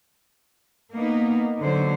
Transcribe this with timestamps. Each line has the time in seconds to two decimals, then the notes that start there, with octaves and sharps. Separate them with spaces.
0.93 A#3 B3 D#4
1.59 D3 F#3 C5